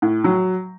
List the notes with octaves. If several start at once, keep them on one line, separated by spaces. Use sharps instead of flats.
A2
F#3